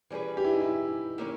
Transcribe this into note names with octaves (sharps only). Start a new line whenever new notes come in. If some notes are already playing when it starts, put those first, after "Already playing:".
E3 G3 C#4 G#4 B4
G4
E4
D#4
E4
D#3 A#3 C#4